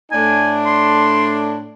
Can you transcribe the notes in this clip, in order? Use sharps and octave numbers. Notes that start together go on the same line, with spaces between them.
A2 A3 D4 G#5
C6